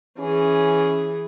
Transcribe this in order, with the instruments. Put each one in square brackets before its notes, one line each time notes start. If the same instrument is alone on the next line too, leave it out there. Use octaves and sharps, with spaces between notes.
[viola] E3 G#4 [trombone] C#4